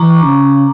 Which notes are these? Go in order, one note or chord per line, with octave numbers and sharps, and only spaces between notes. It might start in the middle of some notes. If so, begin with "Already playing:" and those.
Already playing: E3 A#5 C#6 D6
C#3